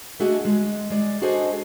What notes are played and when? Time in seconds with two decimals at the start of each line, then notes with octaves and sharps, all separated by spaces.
0.20 A3 D4 F#4 G#4 D#5
0.45 G#3
0.90 G#3 D5
1.22 D4 F#4 G#4 A4 C5 D#5